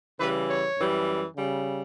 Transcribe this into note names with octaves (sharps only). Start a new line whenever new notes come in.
C#3 E3 G3 B4
C#5
F#2 E3 G3
C#3 G3